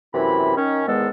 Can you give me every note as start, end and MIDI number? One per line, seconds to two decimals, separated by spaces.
0.14 0.56 42
0.14 0.56 48
0.14 0.56 52
0.14 0.56 64
0.14 0.56 83
0.57 0.83 51
0.57 0.83 61
0.87 1.08 40
0.87 1.08 44
0.87 1.08 51
0.87 1.08 56
0.87 1.08 59
0.87 1.08 69